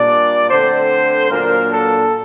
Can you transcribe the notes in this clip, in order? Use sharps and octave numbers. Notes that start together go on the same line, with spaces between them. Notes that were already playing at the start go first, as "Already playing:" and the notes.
Already playing: A#2 G3 D4 D5
D3 A3 C4 C5
A#2 F#3 A#3 D4 A#4
A4